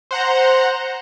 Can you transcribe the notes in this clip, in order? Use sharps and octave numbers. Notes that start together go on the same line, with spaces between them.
C5 F#5 A#5